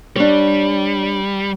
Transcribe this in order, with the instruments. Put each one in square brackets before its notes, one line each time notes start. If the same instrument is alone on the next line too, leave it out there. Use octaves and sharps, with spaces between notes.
[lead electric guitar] G3 [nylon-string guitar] D4 C#5